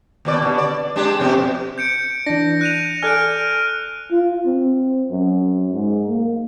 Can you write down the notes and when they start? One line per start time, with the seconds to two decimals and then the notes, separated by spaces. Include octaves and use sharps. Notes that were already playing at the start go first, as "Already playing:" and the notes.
0.25 D#2 B2 D5
0.42 B2 D3
0.58 D5
0.96 G#3 D4 G4
1.20 F2 B2 G4
1.78 G6 C#7 D7
2.27 E3 D4 A#6
2.61 F#6 D#7 F7
3.02 A4 D5 G#5 F6 F#6 D7
4.11 F4
4.46 C4
5.10 F#2
5.73 G#2
6.08 A#3